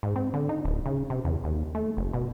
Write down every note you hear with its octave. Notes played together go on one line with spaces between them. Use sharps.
G#2
C4
D3
D#4
D1
C#3
C3
E2
D#2
A3
F#1
B2